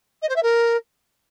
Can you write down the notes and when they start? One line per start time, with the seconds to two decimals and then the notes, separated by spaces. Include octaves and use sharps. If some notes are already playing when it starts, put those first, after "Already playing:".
0.22 D#5
0.29 C5
0.36 E5
0.43 A#4